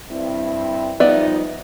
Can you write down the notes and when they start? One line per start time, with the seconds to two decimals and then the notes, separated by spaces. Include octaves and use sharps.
0.11 G2 C4 E4
1.00 F3 G3 B3 D#4 D5 E5